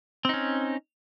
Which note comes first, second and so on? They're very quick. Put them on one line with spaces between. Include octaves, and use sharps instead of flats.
C4 D#4 C#4